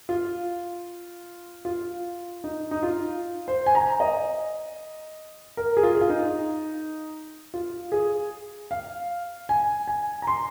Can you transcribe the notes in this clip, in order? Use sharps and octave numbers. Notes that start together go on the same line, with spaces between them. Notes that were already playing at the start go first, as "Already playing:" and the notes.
F4
F4
D#4
D#4
F4
C5
G#5
A#5
D#5
A#4
G#4
F4
G#4
F4
D#4
F4
G#4
F5
G#5
G#5
A#5
C6